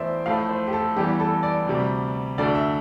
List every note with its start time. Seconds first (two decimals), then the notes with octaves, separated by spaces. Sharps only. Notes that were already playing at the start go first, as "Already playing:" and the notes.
Already playing: E2 E3 A3 C5 D5 E5
0.26 A2 F3 A3 F5
0.49 C5
0.67 G4
0.73 A4
0.96 E2 E3 G3 G4
1.20 A4
1.43 D5
1.67 D2 C3 G3
2.38 D2 D3 A3 D5
2.55 E5